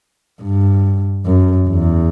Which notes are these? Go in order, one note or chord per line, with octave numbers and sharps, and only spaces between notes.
G2
F#2
E2